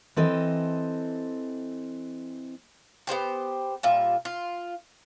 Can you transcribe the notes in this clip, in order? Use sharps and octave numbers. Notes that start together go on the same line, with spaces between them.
E3 C4 A4 D#5
B3 G4 C5 G5
A#2 G3 F4 E5
F4